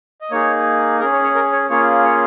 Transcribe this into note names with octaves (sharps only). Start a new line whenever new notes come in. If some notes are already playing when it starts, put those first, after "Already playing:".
D#5
A#3 D#4 G#4 C#5
C#4 G#4 A#4
C#5
C#5
A#4
C#5
A#3 C#4 F4 G#4 C#5
C#5